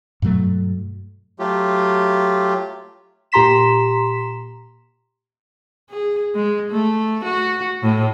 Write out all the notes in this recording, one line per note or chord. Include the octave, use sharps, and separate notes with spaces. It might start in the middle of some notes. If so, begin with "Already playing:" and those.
G2 B2 F#3 A3
F#3 A3 F4 G4
A#2 G4 A#5 C6 B6 E7
G#4
G#3
A3
F#4
A2